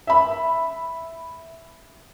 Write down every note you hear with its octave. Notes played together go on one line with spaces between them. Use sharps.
E5 B5